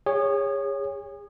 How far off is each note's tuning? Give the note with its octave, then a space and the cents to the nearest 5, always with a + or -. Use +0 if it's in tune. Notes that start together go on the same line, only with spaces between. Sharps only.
G#4 -35 C#5 +0